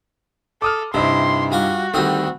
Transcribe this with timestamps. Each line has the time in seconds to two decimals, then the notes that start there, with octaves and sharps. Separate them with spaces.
0.62 A4 D6 D#6 F6
0.94 G2 C3 D#4 E4 C6
1.52 G3 F4 F#4
1.94 D2 D#3 G3 C4 D#6